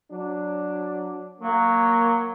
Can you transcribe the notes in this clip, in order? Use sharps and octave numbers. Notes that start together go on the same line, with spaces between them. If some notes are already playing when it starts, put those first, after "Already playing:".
F#3 D4
F#3 A#3